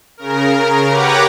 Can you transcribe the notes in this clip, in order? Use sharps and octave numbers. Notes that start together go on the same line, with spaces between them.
C#3 A#4
G4 B4 C#5 F#5 A#5 D6